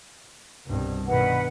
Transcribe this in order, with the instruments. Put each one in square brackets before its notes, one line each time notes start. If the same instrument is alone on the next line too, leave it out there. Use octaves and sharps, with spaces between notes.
[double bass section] C2 G2 B2
[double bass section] G2 B2 D#3 [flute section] B4 F#5